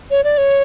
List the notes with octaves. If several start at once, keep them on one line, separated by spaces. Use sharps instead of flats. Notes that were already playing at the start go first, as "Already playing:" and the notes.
C#5
D5
C#5